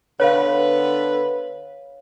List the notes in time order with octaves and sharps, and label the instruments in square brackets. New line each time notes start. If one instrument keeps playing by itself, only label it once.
[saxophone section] D3 B3 B4 [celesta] C#5 F5